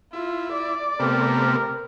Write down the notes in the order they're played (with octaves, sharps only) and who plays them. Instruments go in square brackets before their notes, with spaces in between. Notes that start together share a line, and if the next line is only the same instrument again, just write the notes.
[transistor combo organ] E4 [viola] F4
[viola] D5
[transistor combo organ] C3 A3 B3 [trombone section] C4 G4 A#4